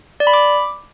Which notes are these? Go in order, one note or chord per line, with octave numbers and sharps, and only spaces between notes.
D5
B5
D6